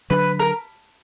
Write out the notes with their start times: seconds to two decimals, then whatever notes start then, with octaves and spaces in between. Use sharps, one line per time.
0.10 D3 F#3 D4 B4
0.39 A#4